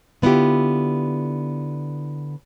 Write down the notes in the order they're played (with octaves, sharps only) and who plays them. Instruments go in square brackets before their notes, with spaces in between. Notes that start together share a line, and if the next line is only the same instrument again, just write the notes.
[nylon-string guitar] D3 B3 E4 F4 G4